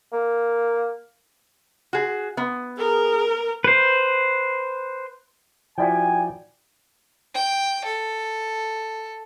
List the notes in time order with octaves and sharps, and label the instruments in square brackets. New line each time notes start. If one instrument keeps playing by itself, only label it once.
[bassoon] A#3
[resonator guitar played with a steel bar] F#4 G#4
B3
[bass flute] G#4 [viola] A#4
[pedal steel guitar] B4 C5
[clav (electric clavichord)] F3 E4 F#4 [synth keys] D5 G5 [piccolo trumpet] G#5
[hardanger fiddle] G5
A4